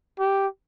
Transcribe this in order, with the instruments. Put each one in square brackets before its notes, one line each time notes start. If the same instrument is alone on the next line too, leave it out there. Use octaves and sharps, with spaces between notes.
[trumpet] G4